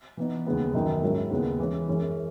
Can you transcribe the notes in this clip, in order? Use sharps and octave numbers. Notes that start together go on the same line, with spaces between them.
E3 B3 D#4
D#2 C#3 G#3 B3
F#2 D#3 F#3 B3 D#4
G#2 F#3 C#4 E4 A#4
D#2 C#3 G#3 B3
E3 G#3 C#4
F#2 E3 G#3 C#4